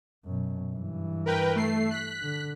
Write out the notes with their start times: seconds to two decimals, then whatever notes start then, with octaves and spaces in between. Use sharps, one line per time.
0.25 F#2 B2
0.72 G2 E3
1.26 A#4 B4 G5
1.56 A3 C7
1.91 F#6 B6
2.22 D3